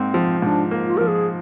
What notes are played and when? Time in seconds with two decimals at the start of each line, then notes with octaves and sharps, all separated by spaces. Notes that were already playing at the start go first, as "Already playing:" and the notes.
Already playing: G#2 A#3 C4
0.14 F3
0.42 G#2 D4
0.71 A#3
0.86 F4
0.97 F3 A#4
1.07 G#4